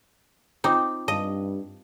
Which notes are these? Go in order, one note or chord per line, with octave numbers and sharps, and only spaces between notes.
C4 D#4 F4 G5 D6
G2 D#5 F5 A5